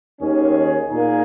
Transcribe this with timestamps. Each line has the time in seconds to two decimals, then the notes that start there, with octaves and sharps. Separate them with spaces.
0.20 D#2 D#3 C#4 G#4
0.91 A#2 A#3 D#4 G#4